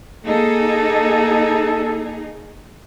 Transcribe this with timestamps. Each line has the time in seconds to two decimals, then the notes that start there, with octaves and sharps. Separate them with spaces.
0.25 A#3 D#4 G#4 A4